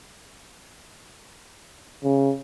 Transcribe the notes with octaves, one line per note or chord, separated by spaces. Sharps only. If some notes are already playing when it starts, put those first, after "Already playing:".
C#3